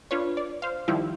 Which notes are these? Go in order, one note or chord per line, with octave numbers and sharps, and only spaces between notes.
D4 F4 B4 C#5
D5
C5 F5
D#3 F3 G3 E4 F4